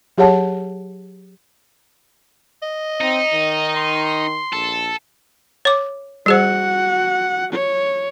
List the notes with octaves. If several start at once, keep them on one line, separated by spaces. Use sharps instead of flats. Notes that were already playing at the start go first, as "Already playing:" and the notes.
F#3 G4 G#4 C#5 F#5 A5
D#5
C4 D#4
D#3
C6
A#1 A4
C#5 D6
G3 F#4 G#4 C5 F#5
C#5